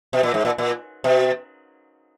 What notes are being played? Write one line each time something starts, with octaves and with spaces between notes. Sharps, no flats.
B2
A#2
G#2
A#2
A#2
B2